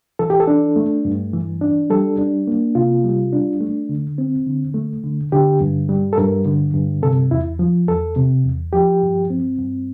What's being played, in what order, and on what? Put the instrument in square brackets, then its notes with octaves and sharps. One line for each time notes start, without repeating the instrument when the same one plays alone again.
[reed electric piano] E3 A4
G4
A4
D4
A3
G2
E3
D4
G3 A4
D4
A#3
C3 F4
G3
D4
A3
D3
C4
D3
A3
D3
D3 G4
G2
G3
A4
G2 A#4
D3
G2
C3 A4
E2 E4
F3
E2 A4
C3
E2
F3 G4
G2
C4
G2